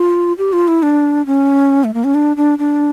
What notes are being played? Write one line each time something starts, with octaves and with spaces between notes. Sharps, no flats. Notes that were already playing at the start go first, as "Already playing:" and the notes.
Already playing: F4
G4
F4
E4
D4
C#4
A3
A#3
C#4
D4
D4
D4